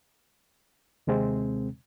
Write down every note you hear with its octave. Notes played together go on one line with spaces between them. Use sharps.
D#2 C3 G#3 C4